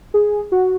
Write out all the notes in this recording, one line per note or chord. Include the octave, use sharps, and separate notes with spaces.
G#4
F#4